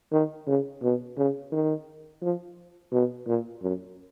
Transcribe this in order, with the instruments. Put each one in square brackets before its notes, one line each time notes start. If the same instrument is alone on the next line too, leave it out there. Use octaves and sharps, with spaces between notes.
[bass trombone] D#3
C#3
B2
C#3
D#3
F3
B2
A#2
F#2